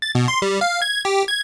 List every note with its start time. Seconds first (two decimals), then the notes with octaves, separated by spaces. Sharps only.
0.02 A6
0.15 B2
0.28 C6
0.42 G3
0.61 F5
0.82 G#6
1.05 G4
1.28 G#6